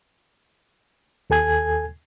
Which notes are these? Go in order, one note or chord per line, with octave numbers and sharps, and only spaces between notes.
D#2 A4 G#5 G#6